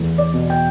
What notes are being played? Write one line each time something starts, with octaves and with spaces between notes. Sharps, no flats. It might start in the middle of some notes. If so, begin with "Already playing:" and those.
Already playing: E2 A3
D5
B2
G5